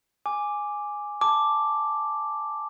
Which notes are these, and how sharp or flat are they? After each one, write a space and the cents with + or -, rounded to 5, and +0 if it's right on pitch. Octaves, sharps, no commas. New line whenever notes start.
G#5 +0 D6 +0
A5 +0 D6 +0